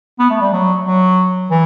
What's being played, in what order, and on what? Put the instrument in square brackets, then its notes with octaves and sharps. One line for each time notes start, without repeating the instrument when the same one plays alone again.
[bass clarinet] B3
A3
G3
F#3
F#3
E3